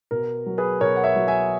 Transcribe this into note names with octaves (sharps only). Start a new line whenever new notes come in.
B2 A#4
F#3
G#4 B4
B2 A#4 C#5
F#5
C#5 E5
F#3
E5 G#5